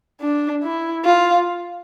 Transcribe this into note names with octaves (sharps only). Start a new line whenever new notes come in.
D4
E4
F4